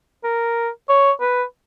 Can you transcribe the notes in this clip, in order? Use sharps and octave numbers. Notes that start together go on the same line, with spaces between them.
A#4
C#5
B4